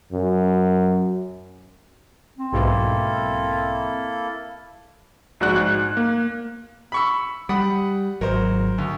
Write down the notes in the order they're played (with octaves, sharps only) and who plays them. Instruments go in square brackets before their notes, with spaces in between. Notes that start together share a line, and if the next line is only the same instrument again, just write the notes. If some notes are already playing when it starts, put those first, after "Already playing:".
[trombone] F#2
[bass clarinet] C4
[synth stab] B1 G#2 B2 [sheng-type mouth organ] A#3 E4 A4
[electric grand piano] A#1 G#2 F#4 D5 F#6
G#2
A#3
[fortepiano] B5 C#6 E6
[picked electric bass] G3 [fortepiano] F#5 B5 D#6
[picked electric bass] G#1 F#3 [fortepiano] A#4 C5
[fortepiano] D2